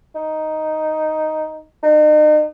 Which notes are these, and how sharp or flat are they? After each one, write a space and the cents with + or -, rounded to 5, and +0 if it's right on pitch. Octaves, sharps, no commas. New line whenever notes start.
D#4 +0
D#4 -40